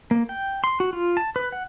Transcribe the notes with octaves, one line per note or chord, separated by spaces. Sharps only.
A#3
G5
C6
F#4
F4
A5
B4
F#5